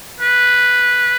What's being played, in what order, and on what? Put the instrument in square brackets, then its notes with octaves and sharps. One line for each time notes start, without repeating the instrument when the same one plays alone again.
[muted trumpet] B4